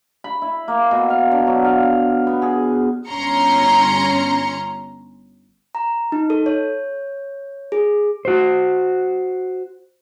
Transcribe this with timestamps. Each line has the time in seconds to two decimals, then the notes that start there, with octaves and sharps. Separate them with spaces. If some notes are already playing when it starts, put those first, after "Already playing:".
0.24 B5
0.42 E4
0.68 A#3
0.91 B2
1.10 F5
1.32 D3
1.47 F#3
1.64 F5
2.27 B3
2.42 G#4
3.08 G1 C#4 A#5 C6 C#7
5.75 A#5
6.12 D#4
6.30 A4
6.46 C#5
7.72 G#4
8.25 F#4 C5